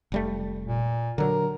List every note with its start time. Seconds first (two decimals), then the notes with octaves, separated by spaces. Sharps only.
0.12 F1 G3 A3
0.66 A#2
1.18 D3 F#3 A#4